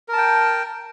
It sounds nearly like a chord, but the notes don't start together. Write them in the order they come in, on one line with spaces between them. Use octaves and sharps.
A#4 A5 G5